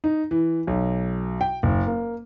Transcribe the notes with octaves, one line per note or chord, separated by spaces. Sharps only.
D#4
E3
B1
G5
F#1
A#3